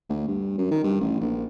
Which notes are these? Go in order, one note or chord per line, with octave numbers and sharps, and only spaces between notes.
D2
G2
F#2
D#3
G2
A1
A#1